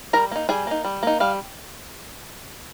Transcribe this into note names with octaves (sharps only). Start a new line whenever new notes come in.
G3 A#4 A#5
A#3 D#4
G3 G#4 G#5
A#3 D#4
G3
A#3 D#4
G3 F5